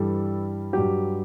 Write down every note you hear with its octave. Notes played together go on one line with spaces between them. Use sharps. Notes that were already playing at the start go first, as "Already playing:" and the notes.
Already playing: G2 E3 G3 A4
G2 F#3 G4